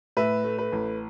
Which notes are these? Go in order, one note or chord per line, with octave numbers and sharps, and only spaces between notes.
A2 B4 E5
A3
B4
A1